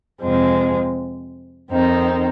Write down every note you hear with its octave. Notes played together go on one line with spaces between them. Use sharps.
F2 C3 F3 G#3 C4
F2 D#3 C4 D#4